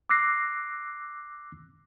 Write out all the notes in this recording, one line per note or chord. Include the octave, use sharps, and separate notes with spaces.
D6 E6 F#6 A#6 C7